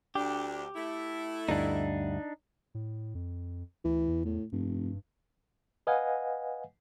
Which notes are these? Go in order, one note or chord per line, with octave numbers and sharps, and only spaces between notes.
D2 D4 G4
A3 E4
D2 G2 D4 D#4
A2
F2
D2 E3
E2
A2
F1 G2
B4 D#5 F5 F#5 G#5